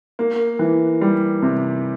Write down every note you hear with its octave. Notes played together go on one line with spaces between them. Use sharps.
A#3
E3
G3
C3